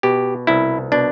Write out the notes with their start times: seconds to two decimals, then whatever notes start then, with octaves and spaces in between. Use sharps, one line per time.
0.03 B2 G4
0.47 C2 E4
0.92 B2 D4